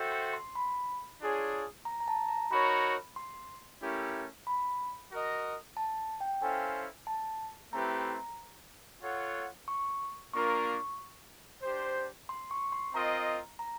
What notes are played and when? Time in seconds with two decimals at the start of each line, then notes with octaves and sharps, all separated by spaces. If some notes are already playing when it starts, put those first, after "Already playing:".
Already playing: F#4 A4 C5 E5 G5
0.12 C6
0.33 C6
0.55 B5
1.20 D4 F4 G#4 C#5
1.85 A#5
2.00 A#5
2.08 A5
2.29 A#5
2.51 D#4 F#4 A#4 C#5 B5
3.16 C6
3.82 A3 C#4 E4 G4 A#4
4.47 B5
5.12 F#4 A#4 D#5
5.77 A5
6.21 G5
6.41 C#4 E4 A4 C5 F5 G#5
7.07 A5
7.73 A3 C4 E4 G4 B4 A#5
9.03 F4 A4 C#5 F#5
9.68 C#6
10.33 A#3 D4 F4 A#4 C#6
11.63 D4 G4 C5
12.29 C6
12.51 C#6
12.72 C6
12.94 C4 F4 A#4 D#5 A#5
13.59 A#5